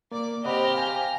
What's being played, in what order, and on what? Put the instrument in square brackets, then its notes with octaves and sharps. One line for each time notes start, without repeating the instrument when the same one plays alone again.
[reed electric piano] A#3 [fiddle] D5 D6
[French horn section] C4 C5 [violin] G4 [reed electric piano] D#5 F#5 B5 [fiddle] A#5 F6
[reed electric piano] F5 G5 G#5